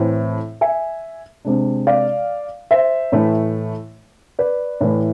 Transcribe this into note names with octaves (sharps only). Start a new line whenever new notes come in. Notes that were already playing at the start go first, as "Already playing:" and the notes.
Already playing: A2 E3 A3 C4
E5 G#5
C3 G#3 D4
D5 F5
C5 E5
A2 E3 A3
B4 D5
A2 E3 A3